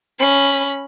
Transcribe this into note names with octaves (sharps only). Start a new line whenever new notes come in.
C#4 B5